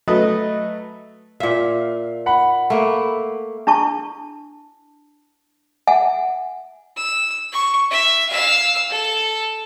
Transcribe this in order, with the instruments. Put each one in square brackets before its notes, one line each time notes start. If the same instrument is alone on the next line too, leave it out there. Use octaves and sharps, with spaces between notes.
[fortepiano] F#3 A3 B4 D#5 D#6
[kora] A#2 E5 [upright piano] F5
[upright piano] F#5 B5
[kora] A3 A#3
[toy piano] D4 E4 A5 C#6
E5 F#5 G#5
[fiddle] E6
C#6
E5
F5 E6
A4